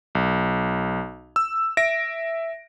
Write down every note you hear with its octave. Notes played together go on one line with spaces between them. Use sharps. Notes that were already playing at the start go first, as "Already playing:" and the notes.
B1
E6
E5 A#6 D7